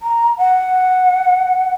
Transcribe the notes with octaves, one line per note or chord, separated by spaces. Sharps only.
A#5
F#5